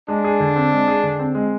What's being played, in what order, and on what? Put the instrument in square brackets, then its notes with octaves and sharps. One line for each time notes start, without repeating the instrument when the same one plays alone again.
[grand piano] G#3 [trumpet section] D4
[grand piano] G#4
D3
C4
G#3
G#4
D3
C4
G#3